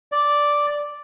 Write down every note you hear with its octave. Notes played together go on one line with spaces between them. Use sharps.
D5